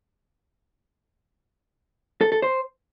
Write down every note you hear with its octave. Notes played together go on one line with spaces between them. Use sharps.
A4
A4
C5